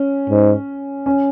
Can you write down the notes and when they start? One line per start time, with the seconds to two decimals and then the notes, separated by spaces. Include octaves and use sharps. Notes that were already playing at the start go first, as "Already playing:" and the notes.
Already playing: C#4
0.30 G#2
1.06 C#4